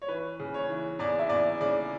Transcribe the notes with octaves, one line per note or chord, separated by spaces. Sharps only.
C#5
E3 B4
C#3
C#5
E3
E2 D5
E5
E2 D5
C#3 D5